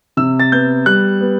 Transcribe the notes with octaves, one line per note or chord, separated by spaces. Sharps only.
C3 E6
A6
B3 G6
G3 F#6
B3